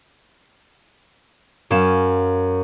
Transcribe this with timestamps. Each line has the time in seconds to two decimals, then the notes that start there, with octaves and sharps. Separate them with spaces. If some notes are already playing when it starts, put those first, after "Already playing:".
1.70 F#2 C#4 F5 E7